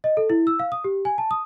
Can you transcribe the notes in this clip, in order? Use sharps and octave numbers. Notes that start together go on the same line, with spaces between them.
D#5
A4
E4
E6
F5
D#6
G4
G#5
A5
D#6